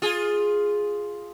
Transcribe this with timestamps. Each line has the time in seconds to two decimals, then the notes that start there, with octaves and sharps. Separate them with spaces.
0.02 F4 G#4